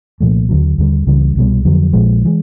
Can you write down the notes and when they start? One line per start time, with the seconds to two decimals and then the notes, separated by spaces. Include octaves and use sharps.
0.20 C2 A#2 F3 A3
0.49 D#2 D3 F#3
0.78 D#2 D3 G3
1.07 C#2 C#3 E3 G3
1.36 C2 B2 G3
1.65 F2 D3 F#3
1.93 A#1 A#2 F3 G#3
2.25 E3 G#3